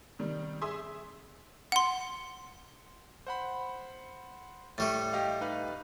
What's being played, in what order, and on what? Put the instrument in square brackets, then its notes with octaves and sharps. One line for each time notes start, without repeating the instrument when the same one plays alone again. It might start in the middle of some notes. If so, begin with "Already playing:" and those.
[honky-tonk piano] C3 D#3 G3
G#4 E5 C6 D#6
[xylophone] F#5 C6
[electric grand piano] C5 F#5 B5
[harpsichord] A2 G3 A3 [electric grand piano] C#6 A6
[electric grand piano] G4 D#5 F5
D#4 B4 F5